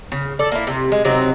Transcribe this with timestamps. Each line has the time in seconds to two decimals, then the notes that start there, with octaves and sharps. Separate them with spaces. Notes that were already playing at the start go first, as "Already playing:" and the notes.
0.12 C#3
0.39 A4 D5
0.52 A#3 E4
0.67 C3
0.92 G#3
1.05 C3 F#3 C4 D#4